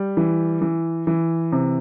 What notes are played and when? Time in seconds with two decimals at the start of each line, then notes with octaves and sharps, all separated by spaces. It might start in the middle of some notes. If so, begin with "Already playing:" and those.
Already playing: G3
0.17 E3
0.62 E3
1.07 E3
1.52 C3